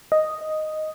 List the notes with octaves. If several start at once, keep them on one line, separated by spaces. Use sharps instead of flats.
D#5